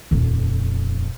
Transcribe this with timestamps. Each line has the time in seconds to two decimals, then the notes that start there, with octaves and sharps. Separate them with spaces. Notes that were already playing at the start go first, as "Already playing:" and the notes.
0.11 D#1 F2